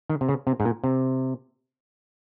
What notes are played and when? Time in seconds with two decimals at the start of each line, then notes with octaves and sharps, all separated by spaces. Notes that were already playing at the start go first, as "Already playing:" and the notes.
0.09 D#3
0.21 C3
0.29 C#3
0.47 C3
0.60 G#2
0.65 A#2
0.84 C3